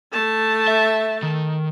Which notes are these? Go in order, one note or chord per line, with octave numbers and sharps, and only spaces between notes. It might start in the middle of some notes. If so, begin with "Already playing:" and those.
A3 A5
E5
D#3